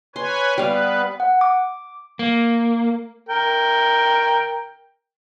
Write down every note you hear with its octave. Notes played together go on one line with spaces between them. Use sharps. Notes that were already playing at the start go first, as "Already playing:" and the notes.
B4 C#5 G#5 C6
G3 B3 B4 F5
F#5
D6
A#3
A#4 G5